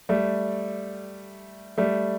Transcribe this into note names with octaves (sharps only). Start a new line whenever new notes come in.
G3 A3
G3 A3